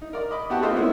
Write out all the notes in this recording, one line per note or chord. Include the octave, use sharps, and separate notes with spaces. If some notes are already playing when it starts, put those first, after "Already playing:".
D#4
A#4 D5
D#5 B5 D6
B3 F#4 G4 F#5 A5
A3 B3 C4 F4 C5 D#5
G#3 A#3 B3 C#4 E4